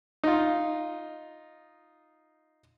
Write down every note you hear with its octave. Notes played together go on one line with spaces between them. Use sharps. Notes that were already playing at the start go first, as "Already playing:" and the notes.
D#4 F4